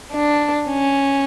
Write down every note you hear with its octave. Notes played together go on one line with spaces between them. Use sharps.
D4
C#4